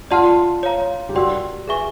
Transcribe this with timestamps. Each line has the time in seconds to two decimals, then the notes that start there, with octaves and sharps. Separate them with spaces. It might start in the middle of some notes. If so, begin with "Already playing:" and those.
0.11 F4 D5 F#5 A5 C6 F6
0.63 C#5 F5 A#5
1.09 G4
1.15 F#4 A#4 D5 G5 C6 E6
1.68 G#4 B4 E5 G#5 C#6